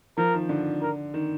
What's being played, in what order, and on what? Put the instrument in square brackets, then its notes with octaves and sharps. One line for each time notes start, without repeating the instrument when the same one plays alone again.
[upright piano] F3 [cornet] A#4
[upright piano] D#3
D3
[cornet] A#4
[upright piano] D#3